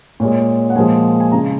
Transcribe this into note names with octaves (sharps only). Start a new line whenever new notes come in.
A#2 G#3 C#5
F#5
A#2 F3 G#3 G#5
G#5
C#3 G#3 A#5